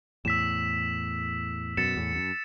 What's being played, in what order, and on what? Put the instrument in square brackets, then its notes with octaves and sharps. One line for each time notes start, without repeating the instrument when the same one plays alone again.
[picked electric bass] E2 A2 [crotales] E6 B6 E7
[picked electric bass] F#2 B2 [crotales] A6 C#7 E7
[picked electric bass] E2 A2
F#2